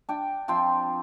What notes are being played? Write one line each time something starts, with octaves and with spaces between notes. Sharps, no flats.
D4 G5
F3 C4 G5 C6